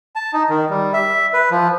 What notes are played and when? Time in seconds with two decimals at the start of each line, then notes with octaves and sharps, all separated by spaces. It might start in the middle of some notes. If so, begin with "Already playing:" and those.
0.15 A5
0.33 D#4
0.50 D#3
0.70 G3
0.94 E5
1.33 B4
1.51 F3